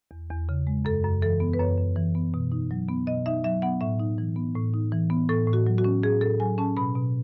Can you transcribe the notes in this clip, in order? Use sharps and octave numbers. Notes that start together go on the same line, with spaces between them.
E2
E2
C#3
G#3
F#2 A4
F#2
E3 A4
B3
B4
F#2 C#5
F#2
E3
B3
B2
D#4
F#3
B3
B2 D#5
D#4 E5
F#3 E5
B3 F#5
A2 E5
D#4
E3
B3
A2
D#4
E3
B3
A2 A4
A2
F#4
F#3
F#4
C#4
A2 G#4
A2 A4
F#3 G#5
C#4 A5
B2 B5
B2